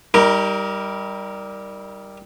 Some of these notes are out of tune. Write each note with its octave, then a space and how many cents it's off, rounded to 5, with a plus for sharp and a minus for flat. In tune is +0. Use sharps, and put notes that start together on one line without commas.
G3 +0 D#4 +40 A#4 +0